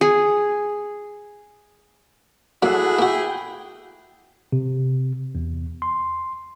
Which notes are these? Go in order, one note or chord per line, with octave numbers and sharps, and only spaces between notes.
G#4
F#2 A#3 E4 F#4 G#4 A4 F#5
A#3 F#4 G5
C3
E2
C6